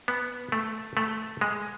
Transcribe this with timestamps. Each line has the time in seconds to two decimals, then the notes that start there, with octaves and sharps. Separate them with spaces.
0.08 B3
0.52 A3
0.97 A3
1.41 G#3